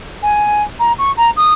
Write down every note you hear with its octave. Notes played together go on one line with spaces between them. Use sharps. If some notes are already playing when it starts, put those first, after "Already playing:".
G#5
A#5
C#6
A#5
D#6